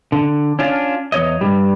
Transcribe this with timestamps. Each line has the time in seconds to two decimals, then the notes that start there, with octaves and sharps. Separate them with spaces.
0.12 D3
0.59 C#4 D4 F4
1.12 E2 C#5 D#5
1.41 G2 C3 G3